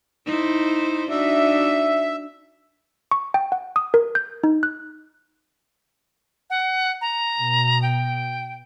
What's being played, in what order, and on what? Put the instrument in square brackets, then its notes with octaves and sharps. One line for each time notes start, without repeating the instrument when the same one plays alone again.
[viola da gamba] D#4 E4 C5
[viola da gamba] D4 D#4 F#4 [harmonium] E5
[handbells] C#6
G5
F#5
D#6
A#4
G6
D#4
F#6
[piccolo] F#5
A#5
[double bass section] B2
[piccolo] G5